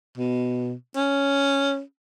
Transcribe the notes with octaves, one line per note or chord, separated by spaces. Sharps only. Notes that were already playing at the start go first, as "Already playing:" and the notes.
B2
C#4